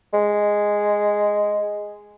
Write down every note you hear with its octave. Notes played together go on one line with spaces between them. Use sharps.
G#3